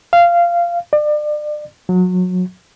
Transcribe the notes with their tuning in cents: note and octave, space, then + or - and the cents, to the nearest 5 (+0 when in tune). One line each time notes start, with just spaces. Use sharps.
F5 -15
D5 +35
F#3 -25